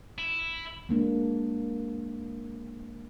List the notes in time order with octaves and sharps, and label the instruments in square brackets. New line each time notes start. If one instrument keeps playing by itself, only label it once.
[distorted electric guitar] E4
[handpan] G#3 A#3 D4